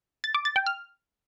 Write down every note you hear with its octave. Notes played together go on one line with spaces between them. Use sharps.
A6
D6
A6
G5
F6